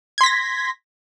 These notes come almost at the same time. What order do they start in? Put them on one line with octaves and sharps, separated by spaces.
G#6 C6 B6 A#6